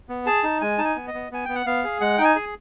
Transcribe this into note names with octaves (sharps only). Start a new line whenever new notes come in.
B3
G#4 A5
D#4
G#3 G#5
D#4 A5
G#5
B3
D#5
B3
B3 G#5
B3 G5
F#5
B3 F5
G#4
G#3 F#5
D#4 G5
G#5
G#4